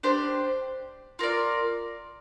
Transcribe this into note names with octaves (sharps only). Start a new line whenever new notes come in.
D4 G4 C5
F4 A#4 D5